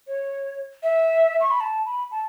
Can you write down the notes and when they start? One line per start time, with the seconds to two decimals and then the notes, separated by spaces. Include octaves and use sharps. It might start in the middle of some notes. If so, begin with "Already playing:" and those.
0.07 C#5
0.83 E5
1.41 C#6
1.51 B5
1.60 A5
1.86 B5
2.11 A5